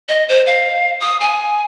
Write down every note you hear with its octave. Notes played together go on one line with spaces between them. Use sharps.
D#5
C5
F5
D#6
G#5